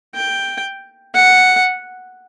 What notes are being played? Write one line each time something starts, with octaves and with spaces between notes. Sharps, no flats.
G5
F#5